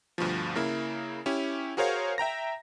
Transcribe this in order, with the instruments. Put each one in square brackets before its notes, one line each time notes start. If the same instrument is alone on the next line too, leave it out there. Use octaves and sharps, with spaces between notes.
[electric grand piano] D2 G2 B2 F3
C#3 A#3 E4
C#4 E4 G4
F#4 G#4 A#4 C5 C#5 F5
E5 G5 A#5 A#6